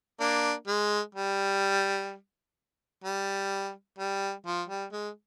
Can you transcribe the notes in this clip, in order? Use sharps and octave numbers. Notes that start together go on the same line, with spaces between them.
A#3 D4
G#3
G3
G3
G3
F3
G3
G#3